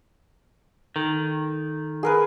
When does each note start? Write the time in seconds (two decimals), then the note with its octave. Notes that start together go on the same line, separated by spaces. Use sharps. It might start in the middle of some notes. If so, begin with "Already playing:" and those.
0.96 D#3 A4
2.03 G#4 A#4 B4